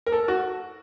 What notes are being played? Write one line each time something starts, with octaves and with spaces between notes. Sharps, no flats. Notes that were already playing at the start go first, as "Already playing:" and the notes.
A#4
A4
F#4